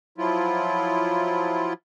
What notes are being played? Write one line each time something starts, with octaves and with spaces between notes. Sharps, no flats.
F3 F#3 E4 F4